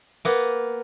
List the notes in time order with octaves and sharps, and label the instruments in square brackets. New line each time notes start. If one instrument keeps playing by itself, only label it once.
[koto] A#3 B3